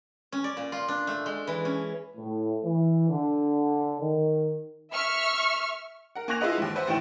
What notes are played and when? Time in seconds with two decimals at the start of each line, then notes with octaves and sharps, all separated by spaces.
0.32 C#4
0.44 D5
0.57 A#2
0.72 F4
0.88 D4
1.07 A3
1.26 G#3
1.47 E3
1.65 C#4
2.17 A2
2.64 E3
3.10 D3
4.01 D#3
4.94 E5 C#6 F6
6.15 A#4 F#5
6.28 A#3 G#5 C#6 F#6 A#6 F7
6.41 E4 F4 G#4 B4 D#5 F#5
6.58 D#2 G#2
6.76 B4 C5 E5 F#5
6.87 A1 A2 D#3 G5 E7